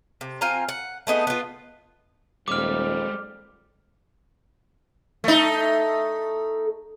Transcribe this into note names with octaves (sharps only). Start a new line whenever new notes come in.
C3
C4 F4 G#5 A#5
F#5
A3 B3 D#4 G#4
B3 F4
D#1 F2 G3 G#3 D6 F6
A3 D#4